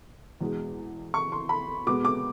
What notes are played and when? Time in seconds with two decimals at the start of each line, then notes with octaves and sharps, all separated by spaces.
0.41 E2 B2 G#3
1.14 C#6
1.32 C6
1.49 B5
1.86 B2 G#3 B3 D6
2.05 D6